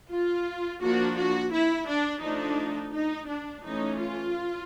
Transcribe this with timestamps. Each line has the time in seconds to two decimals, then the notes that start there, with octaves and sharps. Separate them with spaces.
0.12 F4
0.83 F3 A#3 D4 F#4
1.18 F#4
1.53 E4
1.88 D4
2.24 F3 A3 D4 D#4
2.94 D#4
3.29 D4
3.64 E3 A3 C#4 D#4
4.00 F4